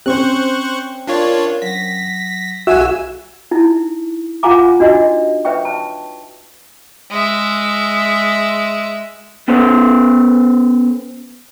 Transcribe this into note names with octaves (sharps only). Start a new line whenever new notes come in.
C4 C#4 C5 C#6 F#6
D4 F4 A#4 C#5
F#3 A#6 B6
B1 F#4 E5 G#5 E6
D#4 E4
F4 F5 F#5 G#5 A#5 D6
D4 D#4 F#4 D#5
B4 C#5 E5 G5 C#6
A5
G#3 E5
B3 C#4 A4 B4 C5